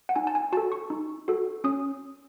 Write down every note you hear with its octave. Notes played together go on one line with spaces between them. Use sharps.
F#5
D#4 G#5
A5
G#5
F#4 A4 A5
C#6
D#4
F#4 A4
C#4 D#6